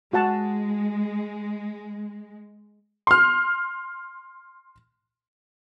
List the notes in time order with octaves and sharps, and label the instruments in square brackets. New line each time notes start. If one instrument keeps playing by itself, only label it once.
[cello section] G#3 [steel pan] F#4 F#5 A5
[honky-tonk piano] C6 F6